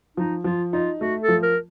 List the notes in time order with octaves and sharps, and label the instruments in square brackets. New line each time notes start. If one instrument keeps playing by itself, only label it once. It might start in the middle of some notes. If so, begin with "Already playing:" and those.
[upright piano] F3 [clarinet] D#4
[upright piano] F3 [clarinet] F4
[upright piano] D#4 [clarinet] F4
[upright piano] A3 [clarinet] F#4
[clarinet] A4
[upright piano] F3
[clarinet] A#4